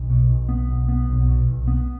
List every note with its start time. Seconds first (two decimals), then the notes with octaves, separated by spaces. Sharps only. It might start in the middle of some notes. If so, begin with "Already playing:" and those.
Already playing: B1
0.10 B2
0.30 B1
0.49 B3
0.68 B1
0.89 B3
1.09 B1
1.28 B2
1.48 B1
1.67 B3